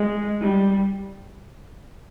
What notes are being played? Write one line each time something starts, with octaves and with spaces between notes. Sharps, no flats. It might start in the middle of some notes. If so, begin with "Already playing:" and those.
Already playing: G#3
G3